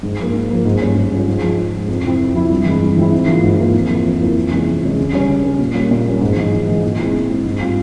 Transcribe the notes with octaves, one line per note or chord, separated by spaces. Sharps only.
G#2
F3 A#3
G#2
F3 A#3
G#2
G3 C#4 F4
G#2
G3 C#4 F4
G#2
F3 G#3
G#2
F3 G#3
F2
C3 F3 C4 E4
F2
C3 F3 C4 E4
G2
E3 G#3 C4 E4
G2
E3 G#3 C4 E4
G#2
E3 A#3 F4
G#2
E3 A#3 F4
F2
E3 A#3 E4
F2
E3 A#3 E4
F2
C3 E3 G#3 C#4
F2
C3 E3 G#3 C#4
C#3
G3 C#4
C#3
G3 C#4
A#2
G3 A#3 C#4
A#2
G3 A#3 C#4
G#2
E3 G#3
G#2
E3 G#3
A#2
G#3 C4 E4
A#2
G#3 C4 E4
G#2
G3 C4 F4